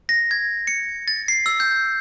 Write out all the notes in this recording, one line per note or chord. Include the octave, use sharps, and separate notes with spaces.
A#6
G#6
C#7
A6
C7
E6
G6